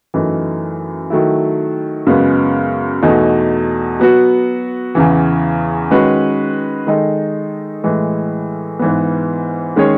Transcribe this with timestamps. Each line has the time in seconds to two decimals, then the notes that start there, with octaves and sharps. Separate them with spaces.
0.14 F#2 E3 A3 D#4
1.10 D#3 F#3 A3 E4
2.07 F#2 C#3 G#3 B3
3.03 E2 B2 A3 D#4
3.99 F#3 B3 F#4
4.95 E2 C#3 E3
5.91 D#3 G#3 C#4 F#4 B4
6.87 D#3 G#3 D#4 A4
7.84 A2 E3 G#3
8.79 G#2 E3 B3
9.76 D#3 G#3 C#4 G#4 C#5